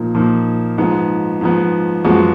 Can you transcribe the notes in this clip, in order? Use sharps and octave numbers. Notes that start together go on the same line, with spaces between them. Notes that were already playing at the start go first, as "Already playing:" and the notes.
Already playing: A#2 F3 A#3 D#4
A#2 F3 A#3 D#4
G#2 F3 B3
G#2 F3 B3
F#2 F3 G#3 B3 F#4